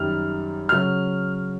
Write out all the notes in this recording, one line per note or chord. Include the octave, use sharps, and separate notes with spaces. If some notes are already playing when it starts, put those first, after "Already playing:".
Already playing: F#2 D#3 G3 F6
C#3 F#3 F6